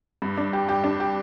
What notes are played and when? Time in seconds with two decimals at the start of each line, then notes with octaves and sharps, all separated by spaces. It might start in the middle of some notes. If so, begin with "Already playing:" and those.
0.22 G2
0.37 D4
0.53 G4
0.69 G4
0.84 D4
1.00 G4